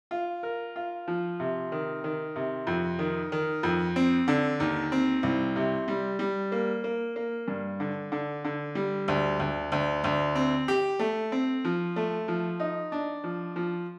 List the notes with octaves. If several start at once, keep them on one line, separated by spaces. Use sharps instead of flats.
F4
A#4
F4
F3
C3
D#3
D#3
C3
F2
D#3
D#3
F2
C4
D3
D#2
C4
C2
C3
G3
G3
A#3
A#3
A#3
G2
D3
D3
D3
G3
D2
D2
D2
D2
C4
G4
A3
C4
F3
A3
F3
D#4
D4
F3
F3